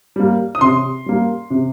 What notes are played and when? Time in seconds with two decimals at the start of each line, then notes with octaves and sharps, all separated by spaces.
0.16 G3 A#3
0.55 D#6
0.61 C3 C6
1.06 G3 A#3
1.50 C3